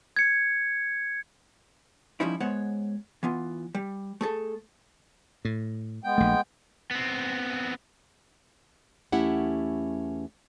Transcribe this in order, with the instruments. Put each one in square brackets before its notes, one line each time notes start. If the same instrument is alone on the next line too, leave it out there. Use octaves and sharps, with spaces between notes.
[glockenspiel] G#6 C#7
[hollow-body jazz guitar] F3 G3 C#4 D#4 E4
G#3 B3 C5 C#5 F#5
E3 B3 F4
G3
A3 G#4 A4
[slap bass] A2
[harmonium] G#3 B3 G5
[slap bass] A#1 A3
[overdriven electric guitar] B3 C4
[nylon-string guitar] E2 A3 C#4 E4 G4 F#5